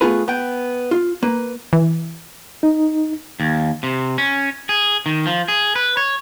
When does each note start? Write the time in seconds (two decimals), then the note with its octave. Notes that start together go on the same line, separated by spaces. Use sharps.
0.01 A3 B3 F4 G#4 B4
0.28 B3 G5
0.91 F4
1.23 A#3 B4
1.73 E3
2.63 D#4
3.40 D#2
3.83 C3
4.18 C#4
4.69 G#4
5.06 D#3
5.26 F3
5.48 G#4
5.76 B4
5.97 C#5